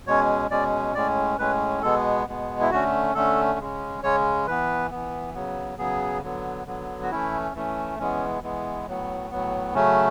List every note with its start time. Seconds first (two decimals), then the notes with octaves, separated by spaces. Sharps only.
0.06 B2 G#3 C#4 C#5
0.50 B2 G#3 C#4 D5
0.95 A2 G#3 C#4 D5
1.38 A2 G#3 C#4 B4
1.82 B2 G#3 B3 A4
2.27 B2 G#3 B3
2.61 E4
2.71 D3 A3 C#4 F#4
3.14 D3 A3 C#4 A4
3.59 C#3 G#3 C#4
4.03 C#3 G#3 C#4 C#5
4.47 E3 B3 B4
4.91 E3 B3
5.34 C#3 F#3 B3
5.78 C#3 F#3 B3 G#4
6.23 D3 F#3 B3
6.66 D3 F#3 B3
7.03 F#4
7.11 E3 A3 C#4 E4
7.55 E3 A3 C#4
7.99 E3 G#3 B3 C#4
8.42 E3 G#3 B3
8.87 A2 F#3 B3
9.31 A2 F#3 B3
9.74 C#3 F#3 A3 C#4